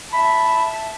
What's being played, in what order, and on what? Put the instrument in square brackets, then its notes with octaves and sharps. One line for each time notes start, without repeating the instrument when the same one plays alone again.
[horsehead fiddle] E5 A5 [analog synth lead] B5